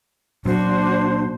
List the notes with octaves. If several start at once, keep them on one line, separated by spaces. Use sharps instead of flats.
A#2 F#3 A#3 D4 F#4 C5 C6